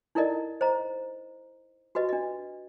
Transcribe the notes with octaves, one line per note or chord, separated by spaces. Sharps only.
D#4 E4 A4 A#4 D5 D#5
C5 D#5 A#5
F#4 G4 B4 D#5
D4 D#5